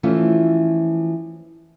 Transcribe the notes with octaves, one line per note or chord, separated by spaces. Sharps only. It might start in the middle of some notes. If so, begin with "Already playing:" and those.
E3 F3 A3 C#4 F4